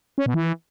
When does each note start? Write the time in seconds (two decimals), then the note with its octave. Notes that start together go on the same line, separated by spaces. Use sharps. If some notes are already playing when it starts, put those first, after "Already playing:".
0.18 C#4
0.26 B2
0.34 E3